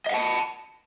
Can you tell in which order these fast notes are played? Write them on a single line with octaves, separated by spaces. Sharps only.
D#5 F5 F#5 A5